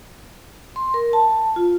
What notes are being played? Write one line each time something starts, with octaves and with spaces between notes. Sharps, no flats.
C6
A#4
A5
F4